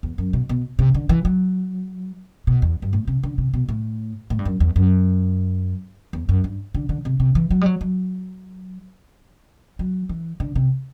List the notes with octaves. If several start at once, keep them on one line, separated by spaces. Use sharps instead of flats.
E2
F#2
B2
B2
C3
D3
E3
F#3
B2
E2
G2
A2
C3
D3
C3
B2
A2
A2
G2
F#2
E2
F#2
E2
F#2
G2
D3
D3
C3
C3
E3
F#3
G3
F#3
F#3
F#3
E3
D3
C3